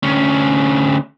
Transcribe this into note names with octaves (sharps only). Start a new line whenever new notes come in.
D2 C#4